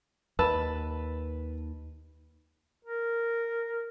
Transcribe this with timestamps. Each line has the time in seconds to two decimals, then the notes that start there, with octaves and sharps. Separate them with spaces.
0.39 D#2 B4 A5 E6
2.85 A#4